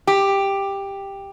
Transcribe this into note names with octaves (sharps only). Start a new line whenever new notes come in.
G4